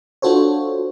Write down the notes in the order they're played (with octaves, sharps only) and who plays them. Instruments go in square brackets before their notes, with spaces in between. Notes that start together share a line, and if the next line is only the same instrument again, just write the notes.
[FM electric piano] D4 F4 F#4 A4 C5 C#5